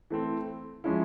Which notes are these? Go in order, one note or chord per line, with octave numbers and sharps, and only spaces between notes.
E3 A3 C4
F3 G#3 C#4 E4